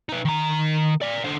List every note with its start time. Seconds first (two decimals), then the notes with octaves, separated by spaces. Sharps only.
0.09 D#4 B4
0.25 D#3 A#5
1.02 D5 F5
1.25 D3 C5